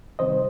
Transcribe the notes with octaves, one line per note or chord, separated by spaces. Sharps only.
C3 D#3 G3 C4 C5 D#5